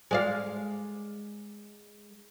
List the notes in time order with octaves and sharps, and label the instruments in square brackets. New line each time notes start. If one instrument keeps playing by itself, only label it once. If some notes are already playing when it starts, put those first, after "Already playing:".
[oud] G#3 D5 F5